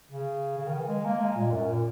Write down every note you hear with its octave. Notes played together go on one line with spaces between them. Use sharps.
C#3
C#3
D#3
E3
G#3
A#3
G#3
A#2
F#2
A#2